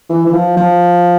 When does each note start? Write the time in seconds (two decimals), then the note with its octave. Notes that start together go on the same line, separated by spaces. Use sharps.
0.09 E3
0.26 E3
0.33 F3
0.57 F3